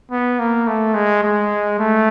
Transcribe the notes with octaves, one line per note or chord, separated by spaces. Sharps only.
B3
A#3
A3
G#3
G#3
A3